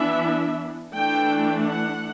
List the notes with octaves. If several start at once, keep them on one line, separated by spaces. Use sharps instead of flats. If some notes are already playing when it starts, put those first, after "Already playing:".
Already playing: E3 B3 D4 E5
E3 A3 D4 G5
F#5